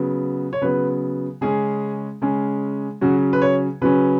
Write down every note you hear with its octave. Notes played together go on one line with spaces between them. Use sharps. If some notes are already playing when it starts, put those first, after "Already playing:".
Already playing: C#3 F#3 B3
C#5
C#3 F#3 B3 B4
C#3 G#3 C#4 G#4
C#3 G#3 C#4
C#3 F#3 C#4 F#4
B4
C#5
C#3 F#3 C#4 B4